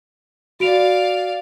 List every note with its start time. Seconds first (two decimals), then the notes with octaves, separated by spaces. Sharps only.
0.60 F#4 D5 F5 D7 F7